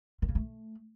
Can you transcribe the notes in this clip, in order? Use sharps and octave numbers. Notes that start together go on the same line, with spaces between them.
D#3
C#3
A3